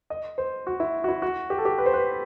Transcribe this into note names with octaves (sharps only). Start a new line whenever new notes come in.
D#5
C5
F#4
E4
F#4
E4
F#4
G4
A4
G4
B4
C5
B4